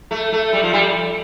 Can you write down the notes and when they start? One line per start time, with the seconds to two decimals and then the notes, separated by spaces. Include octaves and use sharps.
0.11 A3
0.32 A3
0.53 G3
0.63 F3
0.73 G3